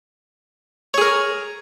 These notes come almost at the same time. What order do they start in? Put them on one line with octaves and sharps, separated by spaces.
C#5 G#4 A#4